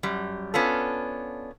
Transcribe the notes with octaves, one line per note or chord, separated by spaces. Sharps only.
F#2 G3
B3 C#4 D4 F4 A4